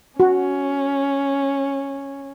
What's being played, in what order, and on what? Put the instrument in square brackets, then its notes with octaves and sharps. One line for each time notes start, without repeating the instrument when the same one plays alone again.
[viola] C#4 [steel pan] F#4